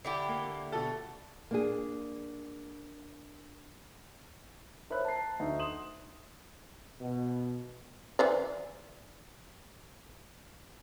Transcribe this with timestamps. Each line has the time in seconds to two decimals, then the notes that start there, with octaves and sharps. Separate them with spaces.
0.05 D3 E4 G4
0.29 A#3
0.72 B2 A4
1.51 A#3 D4 G#4
4.90 A#4 C5 C#5 E5 B5 F#6
5.05 A5 A#5 C7
5.40 D2 D#4 E5
5.59 C6 D#6 E7 F#7
7.00 B2
8.19 E3 C5 D5